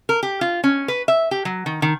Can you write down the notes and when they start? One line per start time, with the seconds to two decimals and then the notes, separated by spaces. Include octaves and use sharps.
0.09 A#4
0.23 G4
0.41 F4
0.64 C#4
0.88 B4
1.08 E5
1.31 G4
1.45 F#3
1.66 D#3
1.82 D#3